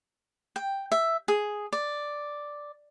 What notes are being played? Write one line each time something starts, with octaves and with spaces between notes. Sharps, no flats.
G5
E5
G#4
D5